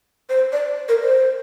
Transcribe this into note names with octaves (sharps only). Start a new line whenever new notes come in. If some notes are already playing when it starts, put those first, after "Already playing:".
C5
D5
A#4
C5